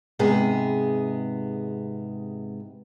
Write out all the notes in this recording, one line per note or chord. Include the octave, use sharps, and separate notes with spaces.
G#2 C3 B3 G#4